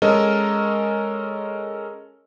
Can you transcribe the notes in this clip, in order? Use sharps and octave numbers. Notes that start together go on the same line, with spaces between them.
G#3 C#4 A4 A#4 D#5